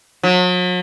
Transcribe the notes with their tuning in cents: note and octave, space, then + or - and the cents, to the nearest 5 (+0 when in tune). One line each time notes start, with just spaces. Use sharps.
F#3 -40